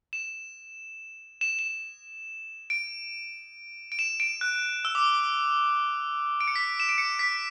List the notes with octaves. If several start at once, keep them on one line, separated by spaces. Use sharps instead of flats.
E7
E7
E7
D7
D7
E7
D7
F#6
E6
D6
D7
C#7
B6
E7
D7
C#7
B6